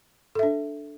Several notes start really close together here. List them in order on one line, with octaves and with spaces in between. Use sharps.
A4 E5 D4